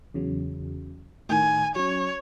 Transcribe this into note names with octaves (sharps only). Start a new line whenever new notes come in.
E2 C#3 F#3
A2 D#3 G#5
F#3 C#4 C#5